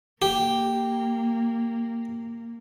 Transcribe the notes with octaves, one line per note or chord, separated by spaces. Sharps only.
A#3 G4